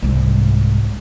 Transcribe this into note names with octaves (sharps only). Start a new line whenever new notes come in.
C2 G#2